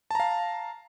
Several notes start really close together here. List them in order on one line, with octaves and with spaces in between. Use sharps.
A5 A#5 F5